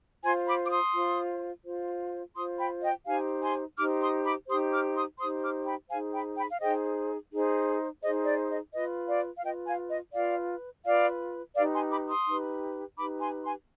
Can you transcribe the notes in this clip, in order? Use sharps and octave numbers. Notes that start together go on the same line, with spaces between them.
F4 C5 G#5 C6
B5 D6
D6
C6 D#6
F4 C5
F4 C5
F4 C5 C6 D#6
G5 B5
D#5 G5
D#4 G4 C5 F5 G#5
G#5 C6
D#4 G4 C5 D6 F6
C6 D#6
B5 D6
D#4 G4 C5 C6 D#6
D6 F6
C6 D#6
D#4 G4 C5 C6 D#6
D6 F6
G5 B5
D#4 G#4 C5 F5 G#5
G5 B5
G5 B5
F5
D#4 G#4 C5 D#5 G5
D#4 G#4 C5
D#4 G#4 C5 D#5
D5
D#5
F4 B4 D#5
D5 F5
F5
F4 B4 D#5 G5
F5 G#5
D#5
F4 B4 D5 F5
F4 B4 D5 F5
D#4 G4 B4 D5 F5
G#5 C6
B5 D6
C6 D#6
D#4 G4 B4
D#4 G4 B4 B5 D6
G#5 C6
G#5 C6